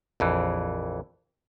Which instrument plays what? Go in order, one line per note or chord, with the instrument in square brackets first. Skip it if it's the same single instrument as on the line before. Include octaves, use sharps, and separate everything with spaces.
[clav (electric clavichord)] A#1 F2 E3